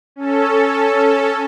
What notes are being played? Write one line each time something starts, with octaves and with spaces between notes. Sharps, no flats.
C#4 A4